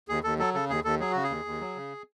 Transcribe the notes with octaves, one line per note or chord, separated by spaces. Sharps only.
D#2 G#4
D#2 A4
F#3 A4
C#3 A4
D#2 G#4
D#2 A4
F#3 G#4
C#3 F#4
G#4
D#2
D#2
F#3
C#3